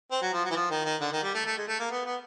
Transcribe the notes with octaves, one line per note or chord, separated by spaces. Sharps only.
C4
F#3
F3
F#3
E3
F3
D#3
D#3
D3
D#3
G3
A3
A3
G#3
A3
A#3
B3
B3